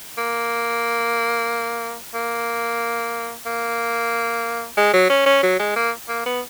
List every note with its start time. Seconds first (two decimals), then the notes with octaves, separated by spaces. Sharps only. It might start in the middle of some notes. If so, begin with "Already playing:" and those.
0.17 A#3
2.14 A#3
3.46 A#3
4.77 G#3
4.93 F#3
5.09 C#4
5.26 C#4
5.43 F#3
5.59 G#3
5.76 A#3
6.09 A#3
6.26 B3